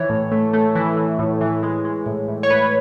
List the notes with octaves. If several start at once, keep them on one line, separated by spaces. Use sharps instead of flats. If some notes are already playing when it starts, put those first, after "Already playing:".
Already playing: E3 C#5
A2
A3
A3
E3
E3
A2
E3
G#3
G#3
A2
A2
C#5
A2 B4